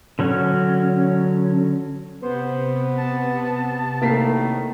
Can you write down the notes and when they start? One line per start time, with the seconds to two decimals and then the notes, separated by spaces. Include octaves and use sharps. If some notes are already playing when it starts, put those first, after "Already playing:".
0.19 D3 F#3 C#4
2.22 C3 B3 C5
2.97 A5
4.02 A2 D#3 A3 A#3 B6 C7